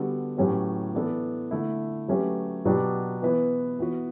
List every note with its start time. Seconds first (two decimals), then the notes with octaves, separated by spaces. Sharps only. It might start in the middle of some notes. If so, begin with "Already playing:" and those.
Already playing: D3 G3 B3 F#4 A4
0.37 A2 F#3 C#4 G4 B4
0.94 E3 B3 D4 A4
1.51 D3 A3 E4
2.08 F#3 A3 C#4 G4 B4
2.65 B2 F#3 B3 D4 G4
3.22 E3 B3 E4 B4
3.79 E3 B3 F#4 B4